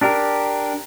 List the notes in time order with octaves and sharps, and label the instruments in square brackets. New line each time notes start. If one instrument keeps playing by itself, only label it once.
[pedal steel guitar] D4 G4 A#4